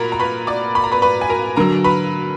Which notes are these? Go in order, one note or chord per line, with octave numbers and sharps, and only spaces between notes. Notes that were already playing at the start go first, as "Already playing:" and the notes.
Already playing: A#2 F#4 A#4 A#5 B5
A#5
B4 B5
D5 D6
B5
A#5
B4 B5
B4 B5
G#5
A#4 A#5
D3 F#3 A#4 A#5
B4 B5